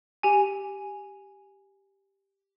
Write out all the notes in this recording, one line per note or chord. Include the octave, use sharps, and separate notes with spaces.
G4 G#5